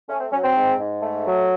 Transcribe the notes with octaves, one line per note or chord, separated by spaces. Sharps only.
A3 C#4
C4
F#3 C#4
C4
G#2
G#2
A3
F#3